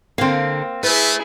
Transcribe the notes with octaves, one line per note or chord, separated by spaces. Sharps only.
D3 A#3 C4 F5
A3 E4 G#4 B4